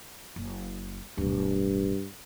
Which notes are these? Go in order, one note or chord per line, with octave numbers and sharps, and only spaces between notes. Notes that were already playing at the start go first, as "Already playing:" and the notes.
F#1
D1 G2 B2